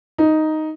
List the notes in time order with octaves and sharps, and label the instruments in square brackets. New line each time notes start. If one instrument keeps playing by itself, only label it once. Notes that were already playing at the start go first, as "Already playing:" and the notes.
[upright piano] D#4